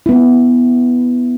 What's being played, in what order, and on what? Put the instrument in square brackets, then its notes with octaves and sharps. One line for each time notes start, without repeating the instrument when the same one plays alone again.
[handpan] B3 E4